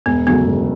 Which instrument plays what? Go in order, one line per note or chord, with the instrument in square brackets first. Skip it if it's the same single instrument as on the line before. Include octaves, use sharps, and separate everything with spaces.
[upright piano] E1 [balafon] B3
[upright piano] D2 C#3 F#3 [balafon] B3
[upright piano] E1